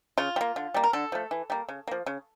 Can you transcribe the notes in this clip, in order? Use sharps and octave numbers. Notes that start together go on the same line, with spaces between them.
C#3 F4
G3
A#3
D3
G3 A#3
A#4
D3 A4
F3 A3
E3
G3 A#3
C#3
F3 A#3
C#3